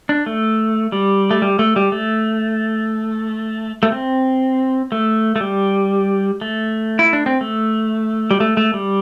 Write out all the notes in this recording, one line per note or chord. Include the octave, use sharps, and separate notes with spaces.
D4
A3
G3
A3
G3
A3
G3
A3
A3
C4
A3
A3
G3
A3
E4
D4
C4
A3
G3
A3
A3
G3